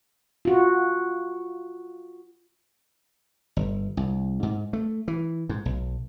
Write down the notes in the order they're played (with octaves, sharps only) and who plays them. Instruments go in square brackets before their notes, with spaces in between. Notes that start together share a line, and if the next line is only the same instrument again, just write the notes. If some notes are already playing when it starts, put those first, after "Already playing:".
[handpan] F4 F#4
[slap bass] G1
C2
G#2
A3
E3
G#2
B1